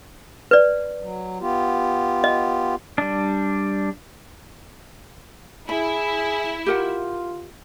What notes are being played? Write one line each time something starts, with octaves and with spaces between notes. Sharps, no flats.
B4 D5
F#3
B3 F4 G4
D#5
G3 D4
E4 G#4 B5
F4 G4 A#4 F#5